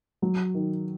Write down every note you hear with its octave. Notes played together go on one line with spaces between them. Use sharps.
F#3
D#3